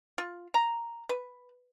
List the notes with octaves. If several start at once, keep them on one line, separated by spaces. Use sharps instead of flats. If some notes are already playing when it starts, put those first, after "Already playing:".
F4
A#5
B4